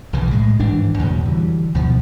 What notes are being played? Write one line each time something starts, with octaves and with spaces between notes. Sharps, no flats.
B1 C#3 E3
A2 G#3
G#1 G2 E3 D4
E2 A#2 C#3 F#3
D3 E3 F#3 G3
D2 B2 D#3 F3